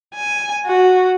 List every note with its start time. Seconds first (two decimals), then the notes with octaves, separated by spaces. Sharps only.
0.15 G#5
0.67 F#4